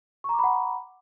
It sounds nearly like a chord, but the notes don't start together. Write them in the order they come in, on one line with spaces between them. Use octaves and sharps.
C#6 A#5 D6 B5 F#5